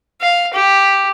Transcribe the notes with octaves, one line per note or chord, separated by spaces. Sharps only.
F5
G4